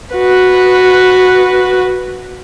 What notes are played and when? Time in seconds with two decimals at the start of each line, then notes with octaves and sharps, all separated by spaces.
0.14 F#4 B4